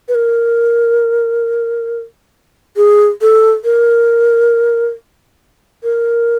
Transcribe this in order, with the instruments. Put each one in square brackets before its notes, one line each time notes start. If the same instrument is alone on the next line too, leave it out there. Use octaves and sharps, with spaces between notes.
[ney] B4
A#4
G#4
A4
A#4
A#4